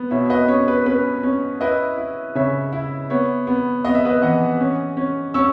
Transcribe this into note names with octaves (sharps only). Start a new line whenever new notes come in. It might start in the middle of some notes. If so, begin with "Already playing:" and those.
Already playing: B3
B2 C#5 E5
B4 D#5
C#4 C#5
B4
C#4 B4
C#4
E4 B4 D#5
E4
C#3 C#5 E5
E4
B3 C#5
B3
B3 D#5
E5
B4 D#5
E3 D#5 F#5
C#4
C#4
C#4 C#6 E6